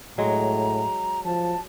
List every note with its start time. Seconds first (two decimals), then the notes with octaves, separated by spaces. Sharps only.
0.18 A2 F#3 G#3 A#5
1.25 F3 A5